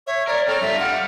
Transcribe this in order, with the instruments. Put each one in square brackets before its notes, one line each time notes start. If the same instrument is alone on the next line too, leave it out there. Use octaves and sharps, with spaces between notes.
[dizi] C#5 [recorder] E5
[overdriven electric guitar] A#4 [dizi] C#5 [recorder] D5
[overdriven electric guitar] C4 [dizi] A4 [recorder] F6
[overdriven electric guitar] G2 F4 [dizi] E5
[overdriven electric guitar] G3 [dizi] F#5